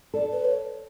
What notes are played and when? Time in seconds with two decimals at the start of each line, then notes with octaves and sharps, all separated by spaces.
0.14 A4 D5
0.32 B4
0.45 C#5